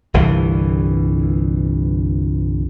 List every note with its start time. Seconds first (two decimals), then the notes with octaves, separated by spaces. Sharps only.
0.14 G1 C2 G2 E3